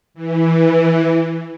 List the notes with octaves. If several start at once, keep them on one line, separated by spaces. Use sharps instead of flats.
E3